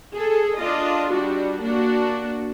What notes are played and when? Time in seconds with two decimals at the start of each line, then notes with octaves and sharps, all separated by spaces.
0.14 G#4 A4
0.59 D4 F4 D#5
1.12 G3 D4 F#4
1.63 A#3 D4 F#4